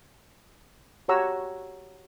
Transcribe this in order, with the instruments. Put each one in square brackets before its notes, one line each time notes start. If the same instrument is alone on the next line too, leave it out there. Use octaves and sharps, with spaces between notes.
[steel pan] F#4 G4 C#5 F#5 A#5 E6